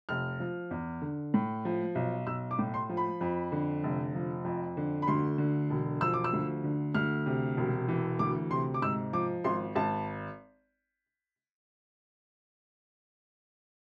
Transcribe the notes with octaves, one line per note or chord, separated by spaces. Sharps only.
F1 F6
F3
E2
D3
A2
F3
B1
B1 E6
D6
A2
C6
F3
B5
F2
D3
F1
F3
F2
D3
B5
D2 C6
D3
E1
F3 E6
D6
E6
D2
D3
D2 F6
C3
E1
E3
D2 D6
C3 C6
D6
G#2 E6
F3 D6
G#1 C6
G#1 A5